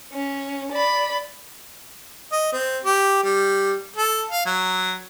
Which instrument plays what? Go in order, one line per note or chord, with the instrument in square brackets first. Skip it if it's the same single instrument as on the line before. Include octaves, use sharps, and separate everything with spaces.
[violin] C#4
D5 B5
[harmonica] D#5
C4
G4
G3
A4
F5
F#3